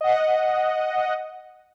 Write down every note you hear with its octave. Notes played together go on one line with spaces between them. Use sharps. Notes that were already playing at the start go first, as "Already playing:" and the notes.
D#5 F#5